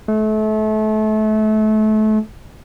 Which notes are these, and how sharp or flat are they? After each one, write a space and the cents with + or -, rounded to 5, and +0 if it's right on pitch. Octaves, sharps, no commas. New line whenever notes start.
A3 -30